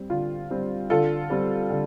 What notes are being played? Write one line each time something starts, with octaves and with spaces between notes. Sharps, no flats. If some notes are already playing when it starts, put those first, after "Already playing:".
Already playing: G3 C4
D3 F4
G3 C4
D3 F4 A4
G3 C4
D3